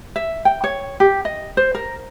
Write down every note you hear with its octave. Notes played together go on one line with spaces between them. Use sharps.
E5
G5
C#5
G4
D#5
C5
A#4